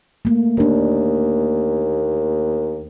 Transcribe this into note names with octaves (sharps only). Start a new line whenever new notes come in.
A3 A#3
D#2 A#3 D4